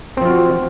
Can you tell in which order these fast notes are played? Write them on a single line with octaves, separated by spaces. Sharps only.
C4 F3 F4 F#4